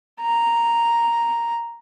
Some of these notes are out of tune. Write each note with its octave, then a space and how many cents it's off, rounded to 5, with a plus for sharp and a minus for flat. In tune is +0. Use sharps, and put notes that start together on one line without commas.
A#5 +0